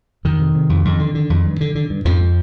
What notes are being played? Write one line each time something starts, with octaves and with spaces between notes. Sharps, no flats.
F2 D#3
C3
C3
F2
F2
D3
D3
F2
G2
D3
D3
G2
F2 G#2 F3